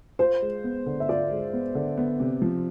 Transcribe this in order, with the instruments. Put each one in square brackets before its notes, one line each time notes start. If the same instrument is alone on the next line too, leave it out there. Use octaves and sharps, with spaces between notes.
[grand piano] F4 [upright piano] C5
[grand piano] G#3
B3
D3
[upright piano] E5
[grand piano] F4 [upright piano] D5
[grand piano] G#3
B3
D3
B3
C3
F3